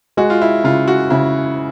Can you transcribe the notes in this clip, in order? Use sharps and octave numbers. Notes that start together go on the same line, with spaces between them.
G#3 F#4
F4
E4
C#3 F4
F#4
C#3 E4